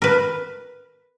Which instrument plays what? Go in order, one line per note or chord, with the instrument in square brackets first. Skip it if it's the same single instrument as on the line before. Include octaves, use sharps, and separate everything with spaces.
[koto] A#4 B4